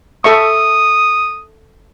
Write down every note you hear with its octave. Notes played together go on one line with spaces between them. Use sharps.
A4 E5 C#6 D#6